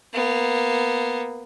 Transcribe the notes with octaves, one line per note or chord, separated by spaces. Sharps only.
A#3 B3